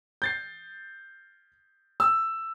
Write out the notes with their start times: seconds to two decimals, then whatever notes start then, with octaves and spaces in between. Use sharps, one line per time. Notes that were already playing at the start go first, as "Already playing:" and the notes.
0.22 G6 A6 C7
2.00 E6